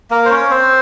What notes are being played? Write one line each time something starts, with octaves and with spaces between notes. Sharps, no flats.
A#3 A#4
C5
C#4 C#5
C4 C5